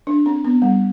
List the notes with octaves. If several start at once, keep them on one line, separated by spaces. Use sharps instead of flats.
D4
C4
B3
G3